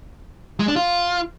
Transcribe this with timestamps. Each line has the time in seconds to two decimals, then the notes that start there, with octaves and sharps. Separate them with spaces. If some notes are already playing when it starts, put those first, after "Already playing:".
0.60 G#3
0.68 D4
0.76 F4